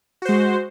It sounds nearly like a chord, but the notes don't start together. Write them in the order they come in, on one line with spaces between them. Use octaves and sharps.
F#4 C5 G#3